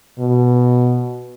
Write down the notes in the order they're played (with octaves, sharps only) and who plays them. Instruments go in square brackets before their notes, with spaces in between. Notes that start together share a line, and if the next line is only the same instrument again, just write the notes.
[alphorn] B2